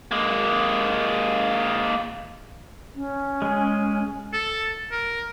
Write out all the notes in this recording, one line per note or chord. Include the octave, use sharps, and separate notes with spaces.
G#3 A#3
C#4
G#3 G#4
A4
A#4